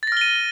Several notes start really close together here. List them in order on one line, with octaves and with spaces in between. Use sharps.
A6 A#6 F6 G7 D#7